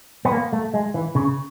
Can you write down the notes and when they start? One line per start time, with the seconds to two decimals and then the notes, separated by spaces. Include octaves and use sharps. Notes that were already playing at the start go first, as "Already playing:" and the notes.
0.25 B3
0.32 A#3
0.53 A3
0.74 G#3
0.94 E3
1.15 C#3